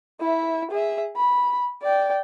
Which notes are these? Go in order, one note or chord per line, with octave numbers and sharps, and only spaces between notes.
E4 E5
G#4 E5
B5
D5 G5